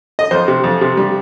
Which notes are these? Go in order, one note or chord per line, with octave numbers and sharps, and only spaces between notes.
D#5
F2 C5
C3
F2
C3
G3